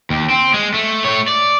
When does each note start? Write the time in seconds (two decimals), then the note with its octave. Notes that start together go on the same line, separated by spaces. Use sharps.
0.10 D#2
0.30 C4
0.54 G#3
0.74 A3
1.04 A3 C#5
1.28 D5